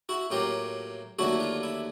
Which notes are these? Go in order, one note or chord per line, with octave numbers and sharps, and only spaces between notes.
E4 F#4
A2 F#3 A#3 F4 G4
D#2 D3 F#3 A3 E4 F#4
F4
E4